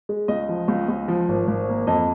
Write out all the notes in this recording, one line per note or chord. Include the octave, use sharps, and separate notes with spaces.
G#3
C#2 D#5
F3
C#2
C#2
F3
G#1
G#1
A#3
F2 D#5